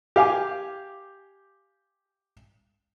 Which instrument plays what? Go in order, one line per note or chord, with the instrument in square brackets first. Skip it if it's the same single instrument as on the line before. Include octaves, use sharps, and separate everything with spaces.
[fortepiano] G4 F5 G#5 D6